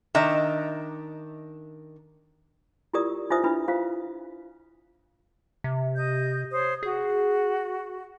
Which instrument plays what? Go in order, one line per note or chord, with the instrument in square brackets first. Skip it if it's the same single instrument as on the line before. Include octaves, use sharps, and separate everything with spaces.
[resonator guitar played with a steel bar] D#3 D4 D#5 E5 A#5
[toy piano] E4 F4 G4 A#4 D5 D#6
D#4 F4 B4 C5 E5 D#6
D4 E4 B4 B5
F4 C5 F5
[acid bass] C3
[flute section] D#5 G6
C5 C#5 D#6
[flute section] F#4 [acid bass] G#4